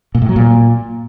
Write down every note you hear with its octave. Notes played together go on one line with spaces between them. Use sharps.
A#2
A2
F#3
A#2